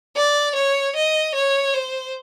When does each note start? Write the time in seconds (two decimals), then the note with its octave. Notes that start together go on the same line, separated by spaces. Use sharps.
0.16 D5
0.55 C#5
0.96 D#5
1.35 C#5
1.74 C5